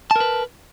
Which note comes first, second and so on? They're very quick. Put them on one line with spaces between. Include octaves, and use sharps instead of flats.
A5 A#4 B4